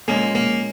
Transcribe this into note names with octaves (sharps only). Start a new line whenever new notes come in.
A#2 G#3 A#3 C#4 G#4
A#3